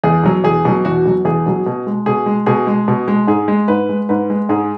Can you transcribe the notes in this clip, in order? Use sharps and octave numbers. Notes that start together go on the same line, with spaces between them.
E2 G#4
B2 F#3
E2 G#4
B2 F#3
E2 F#4
B2 F#3
E2 G#4
B2 F#3
B2
G#3
B2 G#4
G#3
B2 G#4
G#3
B2
G#3
G#2 G#4
G#3
G#2 B4
G#3
G#2 B4
G#3
G#2 G#4